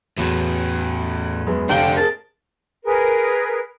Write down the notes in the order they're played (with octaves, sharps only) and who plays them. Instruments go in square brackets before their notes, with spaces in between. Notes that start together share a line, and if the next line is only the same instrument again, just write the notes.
[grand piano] E2 F#3 [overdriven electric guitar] A2 E3
[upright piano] F#2 G#3 B3
[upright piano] F1 F5 G7 [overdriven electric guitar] D4 A4 [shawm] G5 [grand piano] A#5
[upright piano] G#4 A#4 [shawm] A5
[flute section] G#4 A#4 B4